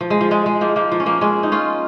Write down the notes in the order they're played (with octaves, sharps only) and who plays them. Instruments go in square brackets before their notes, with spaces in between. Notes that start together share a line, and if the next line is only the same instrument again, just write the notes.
[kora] F3
G#3
F3
G#3
G#3
F3 A#3
F3 A#3
F3
C#4
F3 A#3
G#3 C#4
D#4
C#4 F4